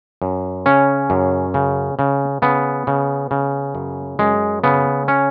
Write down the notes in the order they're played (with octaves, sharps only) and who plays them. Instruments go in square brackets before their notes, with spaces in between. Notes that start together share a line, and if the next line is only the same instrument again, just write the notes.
[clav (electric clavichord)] F#2
C#3 C#4
F#2
C#3
C#3
C#3 B3
C#3
C#3
F#2
F#2 G#3
C#3 B3
C#4